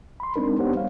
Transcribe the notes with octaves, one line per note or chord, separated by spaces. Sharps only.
B5 C6
G#3 C4 D4 D#4 A#4
B3 D4 G4 C5 C#5 F#5
G3 F5